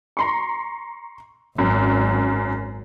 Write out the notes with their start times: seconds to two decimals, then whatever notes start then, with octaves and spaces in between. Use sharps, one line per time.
0.17 A#5 C6 C#6
1.58 G#1 F#2